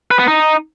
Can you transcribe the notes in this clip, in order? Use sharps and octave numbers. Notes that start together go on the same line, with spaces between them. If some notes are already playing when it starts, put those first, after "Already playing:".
B4
B3
D#4